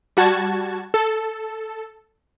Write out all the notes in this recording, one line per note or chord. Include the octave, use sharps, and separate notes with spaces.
G3 F#4 A5 G#6
A4